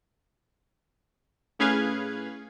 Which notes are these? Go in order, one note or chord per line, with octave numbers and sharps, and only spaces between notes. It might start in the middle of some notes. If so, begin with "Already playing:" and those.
A2 C#4 G#4 B4 F5 G#6